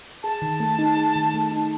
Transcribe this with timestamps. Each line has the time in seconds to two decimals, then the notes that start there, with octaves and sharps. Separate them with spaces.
0.23 G#4 A5
0.42 D#3
0.60 A3
0.78 D#4
0.97 G#4
1.16 D#3
1.34 A3
1.52 D#4